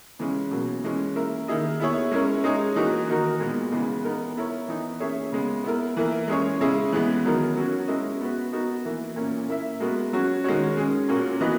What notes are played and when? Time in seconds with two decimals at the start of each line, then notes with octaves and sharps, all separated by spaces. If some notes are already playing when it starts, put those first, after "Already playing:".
0.19 C#3 E3 G#3 C#4
0.51 B2 F#3 A#3
0.84 E3 G#3 C#4
1.16 A#3 E4 A#4
1.48 D#3 A#3 E4 G#4 D#5
1.80 B3 E4 G#4 C#5
2.11 G#3 C#4 E4 A#4 C#5
2.44 G#3 D#4 G#4 C#5
2.76 E3 A#3 D#4 F#4 A#4
3.08 D#3 A#3 D#4 F#4 A#4
3.40 A#2 G#3 B3
3.72 C#3 E3 G#3 B3
4.04 B3 D#4 A#4
4.36 B3 E4 A#4 C#5
4.68 E3 B3 D#4
5.00 A#3 C#4 G#4 C#5 E5
5.32 C#3 G#3 B3
5.64 B3 E4 A#4
5.97 E3 A#3 E4 A#4
6.28 G#3 C#4 G#4 C#5
6.60 C#3 G#3 C#4 E4 G#4
6.93 E3 G#3 B3
7.25 D#3 F#3 B3 D#4 A#4
7.57 F#3 C#4 F#4
7.88 G#3 C#4 E4 A#4 D#5
8.20 B3 F#4 B4
8.53 B3 D#4 F#4 A#4
8.85 E3 A#3 E4
9.16 A#2 A#3 C#4
9.49 A#3 E4 A#4 E5
9.80 G#3 B3 F#4 A#4
10.13 F#3 C#4 F#4
10.44 D#3 G#3 C#4 F#4 C#5
10.77 G#3 C#4 G#4
11.09 A#2 A#3 C#4 F#4
11.41 E3 B3 F#4 B4 D#5